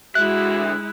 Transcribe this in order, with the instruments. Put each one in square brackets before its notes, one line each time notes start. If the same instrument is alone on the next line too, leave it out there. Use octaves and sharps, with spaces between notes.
[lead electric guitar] D3 E5 [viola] G#3 E4 [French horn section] F#4 [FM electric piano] F#6